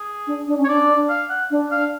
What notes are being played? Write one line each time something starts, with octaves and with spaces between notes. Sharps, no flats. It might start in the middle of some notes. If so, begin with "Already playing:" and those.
Already playing: G#4
D4
D4
C#4
C#5
D4 D5
F5
F#5
D4
F5